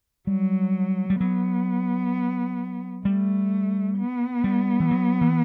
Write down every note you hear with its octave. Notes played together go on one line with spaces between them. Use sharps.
F#3 G3
G3
F#3 B3
G3 A3
B3
G3
E3
F#3
E3